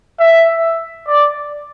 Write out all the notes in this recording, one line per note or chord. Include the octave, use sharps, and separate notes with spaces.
E5
D5